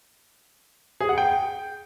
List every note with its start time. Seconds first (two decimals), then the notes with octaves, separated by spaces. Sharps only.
1.00 G#4
1.09 F#5
1.18 G5